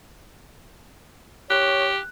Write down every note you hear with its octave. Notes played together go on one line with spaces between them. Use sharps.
G4 C#5 F#6